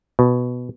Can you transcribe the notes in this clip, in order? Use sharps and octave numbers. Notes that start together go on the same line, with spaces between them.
B2